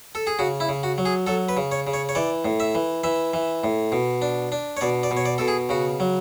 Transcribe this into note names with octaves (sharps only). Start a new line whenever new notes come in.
A4
G#4
C#3 F#4
E4
C#3
F#4
F#3
G#4
F#3 A4
B4
C#3
C#5
C#3
C#5
C#5
E3 D5
A2
E5
E3
E3 E5
E3
A2
B2
D4
D4
C#5
B2 D5
D5
B2
C#5
D5
B2 A4
G#4
C#3 F#4
F#3